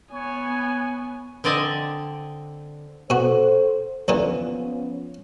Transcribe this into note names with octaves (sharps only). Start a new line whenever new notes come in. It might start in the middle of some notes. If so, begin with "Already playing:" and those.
B3 C#5 G#5
D3 C4 D5 D#5 G#5 A5
B2 F#4 A4 C5
D#2 D3 E3 F3 B3 C#4